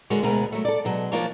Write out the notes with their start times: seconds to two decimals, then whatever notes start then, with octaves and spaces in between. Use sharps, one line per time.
0.10 D3 G#3 F#4 A#4 C#5
0.22 D2 B2 G#3 D4 A#4 B4
0.52 F#3 A3
0.65 A4 D5
0.85 B2 F#3 G#3
1.12 F3 A#3 D4 F4 C#5